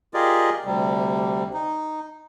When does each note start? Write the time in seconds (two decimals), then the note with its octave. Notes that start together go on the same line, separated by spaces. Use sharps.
0.14 F4 G4 G#4 A#4 D5 D#5
0.65 D2 C3 G3
1.54 D#4